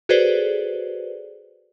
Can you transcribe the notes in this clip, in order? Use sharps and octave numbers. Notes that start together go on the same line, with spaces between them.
F#4 G#4 A4 B4 C5 D5